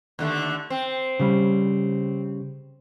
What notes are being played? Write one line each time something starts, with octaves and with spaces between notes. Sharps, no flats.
D#2 D3 A3
C4
C#3 G3